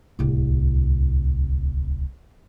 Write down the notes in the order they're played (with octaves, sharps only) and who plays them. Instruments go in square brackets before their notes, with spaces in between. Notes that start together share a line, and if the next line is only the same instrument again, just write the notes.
[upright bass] D1 C2